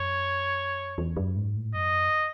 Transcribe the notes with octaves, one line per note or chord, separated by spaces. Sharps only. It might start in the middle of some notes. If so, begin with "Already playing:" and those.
Already playing: F#2 C#5
E2
F#2
G#2
A2
F#2 D#5